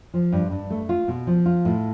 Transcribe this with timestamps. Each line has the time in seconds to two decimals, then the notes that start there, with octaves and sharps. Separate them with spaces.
0.14 F3
0.32 G2
0.51 G2
0.70 A3
0.89 F4
1.08 B2
1.27 F3
1.46 F4
1.65 A2